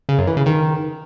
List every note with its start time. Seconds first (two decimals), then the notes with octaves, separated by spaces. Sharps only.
0.09 C#3
0.18 F#2
0.27 E3
0.37 C#3
0.46 D#3